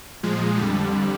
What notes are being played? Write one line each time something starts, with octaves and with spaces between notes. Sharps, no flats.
A#2 F3 G#3
F2 D3 G3